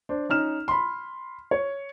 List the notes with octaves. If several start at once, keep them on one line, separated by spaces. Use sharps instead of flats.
D4 C5
C#4 D#4 F6 E7
B5 C6
C#5